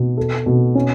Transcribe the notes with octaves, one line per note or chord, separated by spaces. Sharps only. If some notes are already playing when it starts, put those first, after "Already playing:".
Already playing: B2
A4
B2
C#4